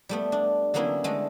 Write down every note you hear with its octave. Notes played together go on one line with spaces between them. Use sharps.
G3 A3 B3
D4
D3 F#3 A#3 B3 C#4 E4
D3 G#3 A3